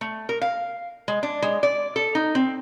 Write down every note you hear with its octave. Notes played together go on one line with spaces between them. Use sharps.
A3
A#4
F5
G#3
D4
G#3
D5
A4
D#4
C4